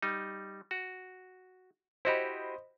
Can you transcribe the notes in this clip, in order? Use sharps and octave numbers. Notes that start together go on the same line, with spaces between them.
G3 D#4
F#4
E4 F#4 G4 C5 D#5 B5